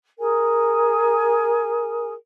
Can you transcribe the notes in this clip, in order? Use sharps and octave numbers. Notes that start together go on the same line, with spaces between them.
G#4 A#4 G#5